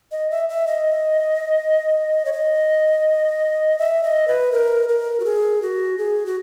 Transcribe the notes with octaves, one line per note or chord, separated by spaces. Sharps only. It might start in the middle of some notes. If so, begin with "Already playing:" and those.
D#5
E5
E5
D#5
C#5
D#5
E5
D#5
B4
A#4
A#4
F#4
G#4
F#4
G#4
F#4